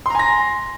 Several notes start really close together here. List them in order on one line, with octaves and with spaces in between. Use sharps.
C6 A#5 G#5 A#6